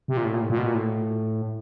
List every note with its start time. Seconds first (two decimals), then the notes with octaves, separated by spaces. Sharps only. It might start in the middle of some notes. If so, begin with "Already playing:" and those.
0.08 C3
0.17 A#2
0.25 A2
0.34 A#2
0.42 A2
0.50 A#2
0.58 B2
0.66 A#2
0.74 A2